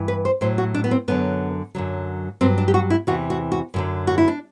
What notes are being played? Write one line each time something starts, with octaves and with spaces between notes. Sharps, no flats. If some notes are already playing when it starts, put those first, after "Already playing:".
Already playing: G2 E3
B4
C5
A2 F#3 C5
F#4
D4
B3
C4
F#2 D3 F#3 B3
F#2 D3 F#3
G2 F#3 C4
D4
G4
F#4
E4
E2 C3 E3 F#4
F#4
F#4
F#2 D3 F#3
F#4
E4
D4